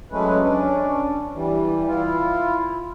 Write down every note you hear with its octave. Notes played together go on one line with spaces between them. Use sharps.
F#3 G#3 A3 C#4 B4
C#4 D4
E3 G3
E4 F4